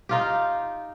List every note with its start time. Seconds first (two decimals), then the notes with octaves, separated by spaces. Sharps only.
0.09 D#4 F4 G4